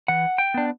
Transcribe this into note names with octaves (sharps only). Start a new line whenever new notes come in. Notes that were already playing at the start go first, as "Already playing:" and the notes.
E3 F#5
G5
B3 D4